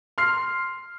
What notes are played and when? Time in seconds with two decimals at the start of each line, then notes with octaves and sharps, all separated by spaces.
0.18 C6 F6 C7